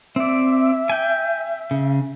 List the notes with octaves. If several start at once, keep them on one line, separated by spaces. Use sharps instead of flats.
C4 D5 E5
G5 G#5
C#3